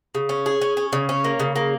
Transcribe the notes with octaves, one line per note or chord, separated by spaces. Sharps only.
C#3
C#4
G#4
C#4
C#4
C#3
C#4
A#3
C#3
A#3